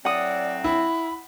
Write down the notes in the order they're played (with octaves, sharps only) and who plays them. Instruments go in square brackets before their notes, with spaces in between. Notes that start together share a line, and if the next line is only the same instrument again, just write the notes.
[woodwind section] A2 F#3 C4 [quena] D5 [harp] F#5 D#6
[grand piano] E4 [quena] B5